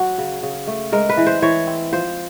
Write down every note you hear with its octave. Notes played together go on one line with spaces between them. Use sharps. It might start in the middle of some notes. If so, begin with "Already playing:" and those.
Already playing: F#3 F#4
C#3
C#3
A3
G#3 A#4
B4
E3
C5
E3 C#5
C4
F3 C5